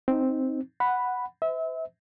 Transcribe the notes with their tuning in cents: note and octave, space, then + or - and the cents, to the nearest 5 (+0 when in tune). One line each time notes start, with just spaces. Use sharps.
C4 +0 D#4 +0
F#5 +0 B5 +0
C5 -45 E5 -30